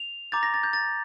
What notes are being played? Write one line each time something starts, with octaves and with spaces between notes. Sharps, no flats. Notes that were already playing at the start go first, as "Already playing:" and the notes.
Already playing: F7
A#5 D6 G6 A6
A#6
A6
G6
A6